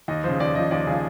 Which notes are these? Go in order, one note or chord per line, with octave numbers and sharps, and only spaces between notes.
D#2 D#5
C#3 F3 C5
D#2 D5
C#3 F3 D#5
D#2 D5
C#3 F3 G#4